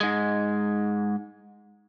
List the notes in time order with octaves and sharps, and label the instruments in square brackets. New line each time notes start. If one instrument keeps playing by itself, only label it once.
[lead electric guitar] G#2 G#3